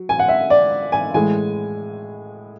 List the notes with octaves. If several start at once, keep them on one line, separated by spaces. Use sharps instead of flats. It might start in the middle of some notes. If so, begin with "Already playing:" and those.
Already playing: F#3
G#5
F#5
E5
D5
G#5
A2 E3 G#3 G#5